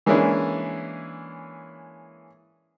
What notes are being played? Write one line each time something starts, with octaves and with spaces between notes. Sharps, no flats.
E3 G#3 A#3 C#4 D4 E4